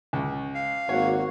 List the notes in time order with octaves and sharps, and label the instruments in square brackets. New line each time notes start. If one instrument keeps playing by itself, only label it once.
[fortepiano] C#2
[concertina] F5
[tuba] G#1 [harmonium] A#3 F#4 F#5 [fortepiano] C#5